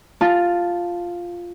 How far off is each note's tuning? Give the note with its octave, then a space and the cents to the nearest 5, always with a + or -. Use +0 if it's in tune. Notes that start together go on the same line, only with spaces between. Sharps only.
F4 +0 A5 +5